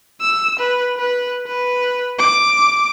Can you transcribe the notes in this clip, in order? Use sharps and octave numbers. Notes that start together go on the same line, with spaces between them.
E6
B4
B4
B4
D6